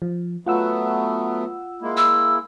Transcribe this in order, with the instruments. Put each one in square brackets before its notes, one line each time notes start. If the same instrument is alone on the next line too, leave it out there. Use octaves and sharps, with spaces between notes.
[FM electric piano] F3
[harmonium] F#3 A3 B3 [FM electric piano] F4 F#5 E6
[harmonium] G#3 A#3 E4
[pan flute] E6